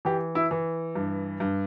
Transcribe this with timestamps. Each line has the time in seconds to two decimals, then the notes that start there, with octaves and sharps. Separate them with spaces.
0.05 E3 G4
0.35 E4
0.51 E3
0.95 G2
1.40 G2